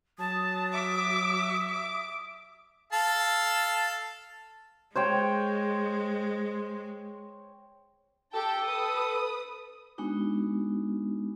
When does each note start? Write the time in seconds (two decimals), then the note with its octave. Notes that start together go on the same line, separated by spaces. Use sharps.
0.19 F#3 A5 D#6
0.73 E5 D6
1.68 D6
2.93 A4 F5 A5
4.95 G#3 C5 C#5 G5
8.34 G4 A4 G5 A5
8.66 B4 D#6
9.98 G#3 B3 D4 D#4 F#4